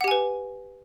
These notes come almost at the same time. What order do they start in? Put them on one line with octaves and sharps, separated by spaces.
F#5 G4 G#5 B4